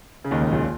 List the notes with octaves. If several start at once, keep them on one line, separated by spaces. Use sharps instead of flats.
C#3
D#2 D#3
C#2 C#3
A#1 A#2
A#2